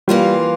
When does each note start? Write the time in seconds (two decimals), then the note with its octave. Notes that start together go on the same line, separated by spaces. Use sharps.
0.08 E3 G3 A#3 F4